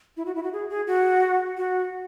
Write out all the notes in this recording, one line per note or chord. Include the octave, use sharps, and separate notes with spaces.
E4
F#4
E4
F#4
G#4
G#4
F#4
F#4